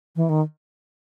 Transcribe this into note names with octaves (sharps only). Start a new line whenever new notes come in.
E3
D#3